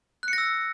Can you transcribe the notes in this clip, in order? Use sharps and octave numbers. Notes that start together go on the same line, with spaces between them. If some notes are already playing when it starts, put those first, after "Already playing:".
E6 F#6 A#6 C#7